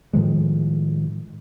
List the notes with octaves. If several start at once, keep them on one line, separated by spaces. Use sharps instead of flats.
A2 D#3 F3 G#3